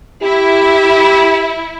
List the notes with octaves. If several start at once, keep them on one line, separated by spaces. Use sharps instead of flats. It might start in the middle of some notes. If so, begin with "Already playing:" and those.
E4 G4